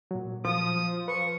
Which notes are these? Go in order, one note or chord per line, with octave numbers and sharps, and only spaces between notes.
A#2 F#3
F3 D#6
B4 C#6